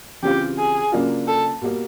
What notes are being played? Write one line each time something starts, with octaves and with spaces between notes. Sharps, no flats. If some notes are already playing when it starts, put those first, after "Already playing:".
C#3 E3 G3 C4 F4 G4
G#4
C#3 F#3 A#3 D4 F4
A4
B2 G3 A#3